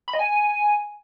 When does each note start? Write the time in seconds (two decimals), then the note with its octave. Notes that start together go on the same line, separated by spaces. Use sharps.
0.08 B5
0.13 D#5
0.19 G#5